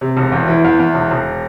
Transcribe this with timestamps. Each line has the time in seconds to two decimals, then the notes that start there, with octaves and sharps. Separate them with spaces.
0.01 C3
0.17 E1
0.32 E2
0.48 E3
0.64 E2
0.79 E2
0.94 E1
1.11 E1